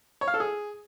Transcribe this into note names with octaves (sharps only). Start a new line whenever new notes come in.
C#5
F5
A4
G#4